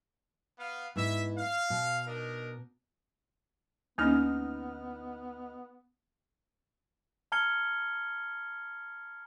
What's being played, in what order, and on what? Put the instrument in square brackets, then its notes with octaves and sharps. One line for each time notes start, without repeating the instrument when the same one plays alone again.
[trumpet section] B3 F5
[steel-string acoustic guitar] G#2 B3 E4 [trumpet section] E5
[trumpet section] F5
[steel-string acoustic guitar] B2
[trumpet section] D4 D#4 A#4
[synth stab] D2 D#4 F6 [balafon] A#3 C#4 [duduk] B3
[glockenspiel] A5 A#5 F6 G#6 C#7 G7